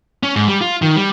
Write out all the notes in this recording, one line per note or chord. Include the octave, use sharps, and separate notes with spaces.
C#4
G#2
G3
F4
D#3
G3